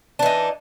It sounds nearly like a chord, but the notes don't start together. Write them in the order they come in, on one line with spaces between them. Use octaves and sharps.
D4 E3 D#4